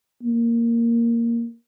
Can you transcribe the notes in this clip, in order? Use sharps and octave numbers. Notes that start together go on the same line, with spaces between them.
A#3